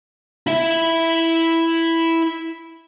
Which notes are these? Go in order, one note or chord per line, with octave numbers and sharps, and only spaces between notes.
E4 E5